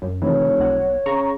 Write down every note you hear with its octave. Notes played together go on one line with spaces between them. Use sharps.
F#2
F1 C3 D#3 E3 C#5
B1 F#5
C#3 A#5 C#6